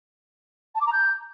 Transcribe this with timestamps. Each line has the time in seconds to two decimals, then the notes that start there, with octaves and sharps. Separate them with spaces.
0.75 A5
0.80 D6
0.86 A#5
0.92 G6